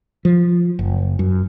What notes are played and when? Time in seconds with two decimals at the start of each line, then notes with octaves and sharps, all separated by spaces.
0.25 F3
0.79 F#1
1.19 F#2